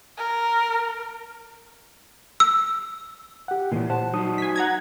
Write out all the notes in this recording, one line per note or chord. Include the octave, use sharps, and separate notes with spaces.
A#4
E6
G4 F#5
A#2 C#3 E3 G#3
C5 F#5 A5
F#3 D#4 F#4 C5 D#6
G#5 B6
F#5 A#5 G#6